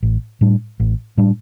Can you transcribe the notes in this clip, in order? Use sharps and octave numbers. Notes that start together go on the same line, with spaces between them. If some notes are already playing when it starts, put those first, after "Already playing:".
A1
A2 G3 D4
A1
A2 G3 D4